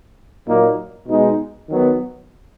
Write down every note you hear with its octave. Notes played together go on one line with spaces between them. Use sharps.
A#2 F#3 A#3 D#4
B2 G#3 D#4
D#3 F#3 B3